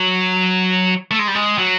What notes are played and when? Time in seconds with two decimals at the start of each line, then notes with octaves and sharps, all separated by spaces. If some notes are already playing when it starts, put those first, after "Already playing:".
Already playing: F#3
1.11 A3
1.19 G#3
1.28 G3
1.35 G#3
1.58 F#3